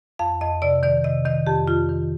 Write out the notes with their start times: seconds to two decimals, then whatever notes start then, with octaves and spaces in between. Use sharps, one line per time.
0.19 F2 F5
0.41 F2 D#5
0.62 C3 D5
0.83 D#3 D5
1.04 C3 D#5
1.25 D#3 D#5
1.46 F2 G4
1.67 F2 F4
1.89 D#3